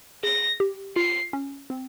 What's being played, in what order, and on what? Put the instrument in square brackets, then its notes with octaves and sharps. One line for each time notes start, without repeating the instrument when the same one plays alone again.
[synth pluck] G#4 [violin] A#6
[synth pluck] G4
[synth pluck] F4 [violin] C7
[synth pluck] C#4
C4